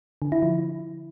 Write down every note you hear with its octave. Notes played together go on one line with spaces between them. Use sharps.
D3
E4
F3